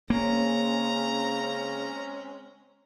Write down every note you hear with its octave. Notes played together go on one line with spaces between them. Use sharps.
C#3 G#3 A#3 C4 C#4 A#5